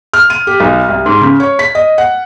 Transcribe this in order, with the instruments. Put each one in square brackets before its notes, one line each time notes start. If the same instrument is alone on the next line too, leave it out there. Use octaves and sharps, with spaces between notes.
[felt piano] F6
D#7
G4
B1
C2
G#2
C#3
C#5
B6
D#5
F#5